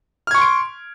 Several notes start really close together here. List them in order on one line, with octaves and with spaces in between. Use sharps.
F6 G#6 C#6 C6 D7